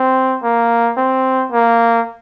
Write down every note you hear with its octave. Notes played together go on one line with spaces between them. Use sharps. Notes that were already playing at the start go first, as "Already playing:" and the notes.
Already playing: C4
A#3
C4
A#3